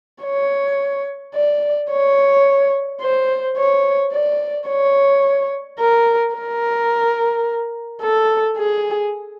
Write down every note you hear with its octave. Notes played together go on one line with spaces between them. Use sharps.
C#5
D5
C#5
C5
C#5
D5
C#5
A#4
A#4
A4
G#4